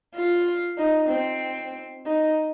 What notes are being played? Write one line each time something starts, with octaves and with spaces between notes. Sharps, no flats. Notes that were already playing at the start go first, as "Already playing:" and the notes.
F4
D#4
C4
D#4